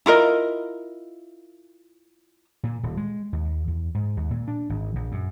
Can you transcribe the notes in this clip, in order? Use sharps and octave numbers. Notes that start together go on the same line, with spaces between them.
E4 F4 A#4 D#5
A#2
D#1
G#3
D#2
E2
G#2
D#2
A#2
D4
G#1
A#1
F#2